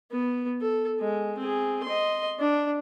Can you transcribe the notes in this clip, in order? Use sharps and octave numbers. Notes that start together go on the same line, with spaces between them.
B3
A4
G#3
C4 G#4
D#5 C6
D4